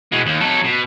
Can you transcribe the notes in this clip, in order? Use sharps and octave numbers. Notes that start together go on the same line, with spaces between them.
B2 G#3
D#2
F#3 A4
B2